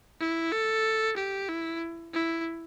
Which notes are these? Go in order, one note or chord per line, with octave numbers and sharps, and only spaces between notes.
E4
A4
G4
E4
E4